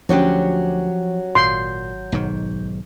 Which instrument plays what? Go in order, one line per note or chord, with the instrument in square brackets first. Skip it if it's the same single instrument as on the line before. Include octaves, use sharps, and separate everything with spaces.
[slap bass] D2 D3 [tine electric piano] F3 [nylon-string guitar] F#3 C#4 G4
[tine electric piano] G#1 G6 [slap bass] A#2 [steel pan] C6
[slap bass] B1 G#2 D#3